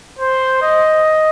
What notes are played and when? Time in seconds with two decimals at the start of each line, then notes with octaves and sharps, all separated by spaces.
0.19 C5
0.63 D#5